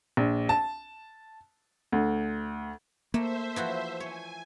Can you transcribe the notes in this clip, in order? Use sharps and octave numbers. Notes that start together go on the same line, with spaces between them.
A#1
A5
D2
A3 A#3 C5 E5
E3 F3 F#4
C#5 G#5